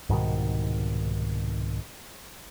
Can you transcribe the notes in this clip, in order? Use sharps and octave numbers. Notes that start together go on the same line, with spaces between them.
C2 G#2 B2 D#3